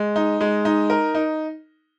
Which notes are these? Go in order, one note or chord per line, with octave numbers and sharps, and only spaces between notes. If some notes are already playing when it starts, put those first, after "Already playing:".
Already playing: G#3
D#4
G#3
D#4
A#4
D#4